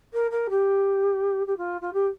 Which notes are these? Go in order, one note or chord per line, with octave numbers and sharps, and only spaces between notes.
A#4
A#4
G4
G4
F4
F4
G4